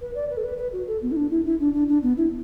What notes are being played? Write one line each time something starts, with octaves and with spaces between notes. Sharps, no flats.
B4
D5
B4
A4
B4
B4
F#4
A4
B3
E4
D4
E4
E4
D4
D4
D4
B3
E4